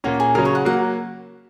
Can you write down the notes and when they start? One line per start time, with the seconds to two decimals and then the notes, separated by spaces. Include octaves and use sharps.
0.04 A#2 A#3 C#4 F#4
0.20 G#4
0.35 C#3 F#3 C#4 A#4
0.45 C#5
0.55 F#5
0.65 F#3 A#3 F#5